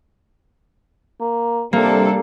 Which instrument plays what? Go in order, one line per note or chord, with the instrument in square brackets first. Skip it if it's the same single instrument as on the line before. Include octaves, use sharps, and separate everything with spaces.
[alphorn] A#3
[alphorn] C3 [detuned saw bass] G3 [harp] A#3 [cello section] D4 A4